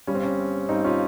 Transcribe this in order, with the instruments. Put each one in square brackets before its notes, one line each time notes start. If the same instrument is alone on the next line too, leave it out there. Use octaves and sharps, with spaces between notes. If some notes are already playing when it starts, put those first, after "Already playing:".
[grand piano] G1 G2 G3 C#4
C4
C#4
G1 G2 G3 C4 D#4
C#4 F4